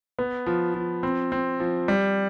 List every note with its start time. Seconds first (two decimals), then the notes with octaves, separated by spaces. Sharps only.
0.19 B3
0.46 F3
0.74 F3
1.03 C4
1.32 C4
1.60 F3
1.88 G3